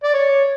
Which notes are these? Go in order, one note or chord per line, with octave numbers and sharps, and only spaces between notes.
D5
C#5